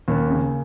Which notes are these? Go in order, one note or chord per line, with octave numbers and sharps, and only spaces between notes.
D#2 A#3 C#4
C#3